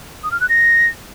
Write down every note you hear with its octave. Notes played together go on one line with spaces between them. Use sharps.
D#6
F6
F#6
A#6